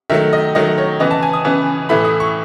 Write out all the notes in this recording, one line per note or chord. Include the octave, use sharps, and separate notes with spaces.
D#3 F#3 A3 E5
D#5
D#3 F#3 A3 D#5
C#5
C#3 E3 B3 D#5
A5
G#5
D#6
C#3 E3 B3
A2 E3 A3 E4 B5
D#6
C#6